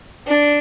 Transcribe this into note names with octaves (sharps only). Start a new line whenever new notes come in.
D4